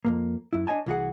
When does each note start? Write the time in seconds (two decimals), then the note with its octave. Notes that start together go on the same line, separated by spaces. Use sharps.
0.05 F2 G#2 A#3
0.53 F#2 E4
0.67 D4 C#5 D#5 G#5 A5
0.86 C2 E3 F4 F#4 G#4 F#5